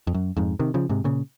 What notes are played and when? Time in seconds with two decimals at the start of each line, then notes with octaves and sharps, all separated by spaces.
0.07 F2
0.14 F#2
0.37 F2 G#2
0.59 C3 D#3
0.74 C#3 F3
0.89 G#2 C3
1.04 A#2 C#3